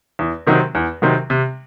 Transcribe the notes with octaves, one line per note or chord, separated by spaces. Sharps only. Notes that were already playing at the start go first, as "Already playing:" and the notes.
E2
C3 D#3 F#3 C4
E2
C3 D#3 F#3 C4
C3